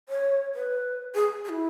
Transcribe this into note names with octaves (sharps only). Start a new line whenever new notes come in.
C#5
B4
G#4
G#4
E4